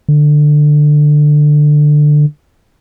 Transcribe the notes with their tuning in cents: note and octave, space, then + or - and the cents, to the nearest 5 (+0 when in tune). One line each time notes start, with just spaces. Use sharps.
D3 +15